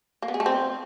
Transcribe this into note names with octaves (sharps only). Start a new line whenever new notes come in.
A#3
B3
G#4
A3
C4